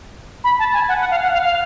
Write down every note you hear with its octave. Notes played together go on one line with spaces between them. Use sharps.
B5
A5
G#5
F#5
F#5
F5
F#5
F5
F5